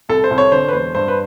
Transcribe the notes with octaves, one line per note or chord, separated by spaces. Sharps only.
C2 A4
C5
C2
C#5
D3 C5
B4
E1 C5
G2 C5
B4